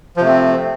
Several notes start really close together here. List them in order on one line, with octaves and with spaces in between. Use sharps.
F3 C3 A3 C4